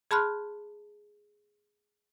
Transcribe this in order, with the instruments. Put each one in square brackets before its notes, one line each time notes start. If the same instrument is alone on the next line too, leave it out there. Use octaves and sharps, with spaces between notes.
[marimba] G#4 A5 B5 C6 F6 F#6